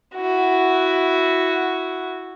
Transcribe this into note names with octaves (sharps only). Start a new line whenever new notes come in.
E4 F#4